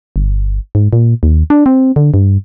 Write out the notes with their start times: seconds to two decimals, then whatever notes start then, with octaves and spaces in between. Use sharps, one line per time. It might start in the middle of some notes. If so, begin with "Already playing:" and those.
0.16 G1
0.75 G#2
0.93 A#2
1.23 D#2
1.50 D4
1.66 C4
1.96 D3
2.14 G2